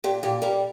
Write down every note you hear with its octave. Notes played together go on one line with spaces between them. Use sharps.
A#2 G4
A#2 G4
G3 G4 A#4